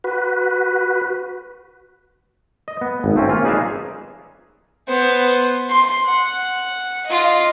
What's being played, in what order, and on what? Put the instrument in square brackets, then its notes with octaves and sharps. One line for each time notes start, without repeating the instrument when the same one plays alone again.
[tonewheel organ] F#4 B4
[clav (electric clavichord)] D#5
B3
G#1
A3 C4 C#4
A#3 C#4 F4
D#4 G#4 B4 D5 E5 F5
[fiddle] B3 C5
C6
F#5
F4 D#5